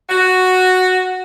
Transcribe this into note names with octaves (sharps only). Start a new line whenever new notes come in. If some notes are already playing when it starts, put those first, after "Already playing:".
F#4